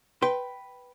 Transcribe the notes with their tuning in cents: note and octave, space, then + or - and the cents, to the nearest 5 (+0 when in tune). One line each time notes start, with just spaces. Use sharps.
B4 +0 G5 -10 C6 +0